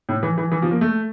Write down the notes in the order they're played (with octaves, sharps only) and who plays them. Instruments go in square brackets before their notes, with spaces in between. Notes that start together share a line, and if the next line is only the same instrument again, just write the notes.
[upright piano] A2
E3
E3
E3
F3
A#3
A3